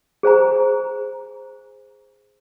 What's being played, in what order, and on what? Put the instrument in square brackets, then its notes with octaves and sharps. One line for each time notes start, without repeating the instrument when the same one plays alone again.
[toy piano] G#4 C5 G#5 A#5